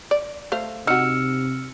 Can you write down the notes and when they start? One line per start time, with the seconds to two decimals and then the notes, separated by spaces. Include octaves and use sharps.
0.11 D5
0.52 A3 C5 F5
0.87 C3 D#4 F#4 E6 F6 C#7